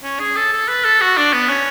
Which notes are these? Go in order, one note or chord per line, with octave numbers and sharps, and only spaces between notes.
C#4
G#4
A4
A4
B4
A4
F#4
D4
B3
C#4